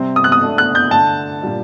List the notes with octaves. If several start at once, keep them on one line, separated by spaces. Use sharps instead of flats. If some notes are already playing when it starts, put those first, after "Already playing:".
Already playing: C3 G3 C4
D#6
F#6
D#6
A3 D4 A4
F#6
G6
D3 A3 D4 A4 D5 A5
A#2 G3 D4